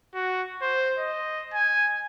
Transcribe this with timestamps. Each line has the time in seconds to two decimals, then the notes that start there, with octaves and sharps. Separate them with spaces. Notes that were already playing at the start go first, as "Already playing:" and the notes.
0.15 F#4
0.62 C5
0.99 D#5
1.54 G#5